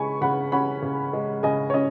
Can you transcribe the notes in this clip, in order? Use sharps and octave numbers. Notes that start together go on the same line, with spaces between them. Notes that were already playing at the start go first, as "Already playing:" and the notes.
Already playing: C#3 G#3 G#5 B5 C#6
C#3 F#5 B5
C#4 F#5 B5
C#3
G#3
C#3 D#5 G#5
C#5
C#4 D#5